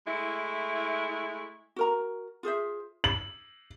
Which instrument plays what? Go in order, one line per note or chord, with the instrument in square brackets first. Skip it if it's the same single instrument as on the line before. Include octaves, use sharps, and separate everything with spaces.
[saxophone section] G#3 A3 E4
[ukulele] F#4 A#4 A#5
F4 G#4 C5 E5
[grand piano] F#7